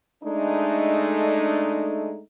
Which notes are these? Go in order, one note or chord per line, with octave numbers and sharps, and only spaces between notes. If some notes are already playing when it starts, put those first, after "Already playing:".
G#3 A3 D4 D#4